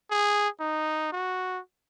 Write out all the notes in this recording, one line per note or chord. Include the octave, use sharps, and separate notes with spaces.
G#4
D#4
F#4